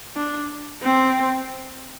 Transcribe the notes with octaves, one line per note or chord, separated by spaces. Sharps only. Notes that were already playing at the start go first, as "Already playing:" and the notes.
D4
C4